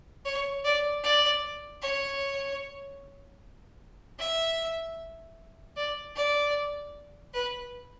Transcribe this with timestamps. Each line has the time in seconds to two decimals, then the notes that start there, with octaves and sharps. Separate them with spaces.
0.25 C#5
0.64 D5
1.03 D5
1.82 C#5
4.18 E5
5.76 D5
6.16 D5
7.33 B4